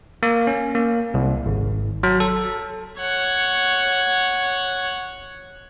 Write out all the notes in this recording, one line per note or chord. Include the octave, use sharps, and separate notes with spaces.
A#3
C#4
A#3
C2
G#1
F#3
A4
C#5 F#5